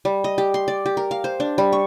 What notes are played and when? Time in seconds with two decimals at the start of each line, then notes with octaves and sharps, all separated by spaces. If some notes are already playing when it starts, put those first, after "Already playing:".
0.05 G3
0.24 D#5
0.38 G4
0.54 C6
0.68 D5
0.86 G4
0.97 A#4
1.11 F5
1.24 C5
1.40 D4
1.58 G3
1.73 C#6